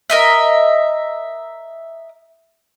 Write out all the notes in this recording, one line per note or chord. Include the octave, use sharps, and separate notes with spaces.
A#4 D#5 E5